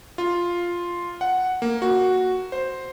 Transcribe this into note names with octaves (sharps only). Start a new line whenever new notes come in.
F4
F#5
A#3
F#4
C5